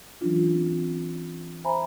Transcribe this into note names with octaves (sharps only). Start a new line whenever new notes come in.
E3 F#3 C#4 D4 F4
C4
C5 E5 G#5 A#5 B5